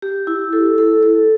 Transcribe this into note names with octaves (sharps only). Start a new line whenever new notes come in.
G4
E4
A4
A4
A4